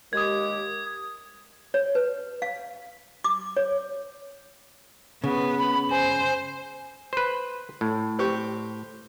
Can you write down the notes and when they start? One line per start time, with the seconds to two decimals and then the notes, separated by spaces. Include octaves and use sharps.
0.13 D#2 G#3 G4 D#6 G#6
1.74 C#5
1.95 B4
2.42 F5
3.24 D6
3.57 C#5
5.24 C#3 B3
5.58 B5
5.90 C5 G#5
7.13 B4 C5
7.81 A2
8.19 C4 G4 C#6